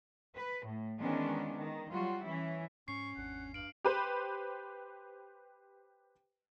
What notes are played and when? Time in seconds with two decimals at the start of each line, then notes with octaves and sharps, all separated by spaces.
0.35 B4
0.66 A2
1.00 D#3 E3 G#3 B3 C#4 D4
1.56 D#3
1.92 F#3 G3 F4 F#4
2.25 E3 C#4 E4
2.88 G#2 C#4 C#6 C7
3.17 G#1 E2 D4 F#5
3.54 G2 F5 D7 F#7
3.85 G4 B4 C5